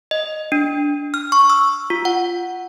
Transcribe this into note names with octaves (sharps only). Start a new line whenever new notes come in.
D#5
D4
F6
C#6
E6
F4
F#5